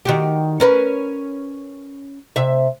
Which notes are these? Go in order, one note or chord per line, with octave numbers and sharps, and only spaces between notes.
D#3 F#4 G4
C#4 A#4 B4
C3 E5